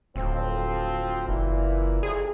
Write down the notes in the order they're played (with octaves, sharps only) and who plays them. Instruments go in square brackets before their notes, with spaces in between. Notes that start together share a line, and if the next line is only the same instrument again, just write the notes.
[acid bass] D1 [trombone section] F3 C4
[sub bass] F#1 [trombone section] A#2 E3
[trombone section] F2 C3 [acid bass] G#4